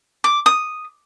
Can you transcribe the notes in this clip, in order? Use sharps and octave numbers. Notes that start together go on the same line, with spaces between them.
D6
D#6